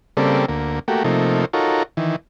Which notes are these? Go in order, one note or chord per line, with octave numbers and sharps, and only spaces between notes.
C#3 G3 A#3 C4 A4 D5
D2 A#3
A3 A#3 F#4 G4
C3 F3 A3 A#3 D#4
D#4 F4 F#4 A4 A#4 C#5
D#3 E3